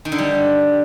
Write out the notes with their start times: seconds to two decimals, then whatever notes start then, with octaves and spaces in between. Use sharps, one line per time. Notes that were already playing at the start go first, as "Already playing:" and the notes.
0.05 D#3
0.12 D3
0.18 G3